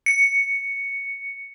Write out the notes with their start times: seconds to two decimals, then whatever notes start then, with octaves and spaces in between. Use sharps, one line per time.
0.06 C#7